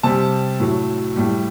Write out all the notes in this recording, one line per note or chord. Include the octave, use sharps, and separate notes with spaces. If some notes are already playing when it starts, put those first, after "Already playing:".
C3 G3 A5
A2 F#3
A2 G3